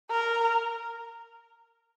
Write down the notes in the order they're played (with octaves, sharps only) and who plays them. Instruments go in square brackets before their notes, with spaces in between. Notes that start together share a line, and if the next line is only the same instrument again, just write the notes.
[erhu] A#4